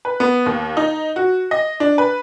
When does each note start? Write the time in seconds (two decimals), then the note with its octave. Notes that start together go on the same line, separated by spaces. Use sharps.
0.05 B4
0.20 B3
0.46 D#2
0.77 D#4
1.16 F#4
1.51 D#5
1.80 D4
1.98 B4